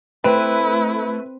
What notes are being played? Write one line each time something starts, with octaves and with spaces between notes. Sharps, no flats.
A3 C4 E4 B4